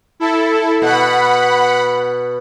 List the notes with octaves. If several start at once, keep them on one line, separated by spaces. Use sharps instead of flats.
E4 A4
B2 F#5 B5